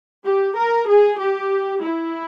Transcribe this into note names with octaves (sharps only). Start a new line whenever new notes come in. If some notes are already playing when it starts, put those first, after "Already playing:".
G4
A#4
G#4
G4
E4